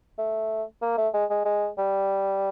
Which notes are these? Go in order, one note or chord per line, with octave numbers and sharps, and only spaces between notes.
A3
A#3
A3
G#3
G#3
G#3
G3